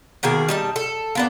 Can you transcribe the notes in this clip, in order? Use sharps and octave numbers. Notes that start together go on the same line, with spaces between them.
B2 D#3 A#3 G#4
G3 D#4 A5
A4
A#3 B3 D4